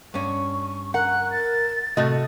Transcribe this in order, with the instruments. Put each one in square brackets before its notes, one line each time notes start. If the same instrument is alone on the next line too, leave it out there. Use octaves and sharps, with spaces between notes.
[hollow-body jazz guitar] G2 C#4 [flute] C#6
[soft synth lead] A#4 [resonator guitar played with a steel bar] F#5 [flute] F#6
[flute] A6
[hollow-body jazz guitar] A2 [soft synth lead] C3 [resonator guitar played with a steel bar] A3 F#4 D#5